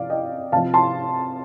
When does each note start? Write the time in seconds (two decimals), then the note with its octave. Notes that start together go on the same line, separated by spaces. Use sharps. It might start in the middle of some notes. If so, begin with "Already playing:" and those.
Already playing: C3 F3 D5 F5
0.10 D#5 G5
0.52 C3 F3 F5 A5
0.74 A5 C6